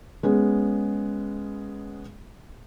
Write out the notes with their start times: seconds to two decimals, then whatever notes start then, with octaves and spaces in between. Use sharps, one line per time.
0.23 G#3 B3 C#4 G#4